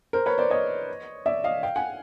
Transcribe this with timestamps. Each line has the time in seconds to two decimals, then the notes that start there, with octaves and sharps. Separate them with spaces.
0.13 A#4 C5
0.26 B4 C#5
0.38 C5 D5
0.50 C#5 D#5
1.26 D5 E5
1.44 D#5 F5
1.63 F5 G5
1.76 F#5 G#5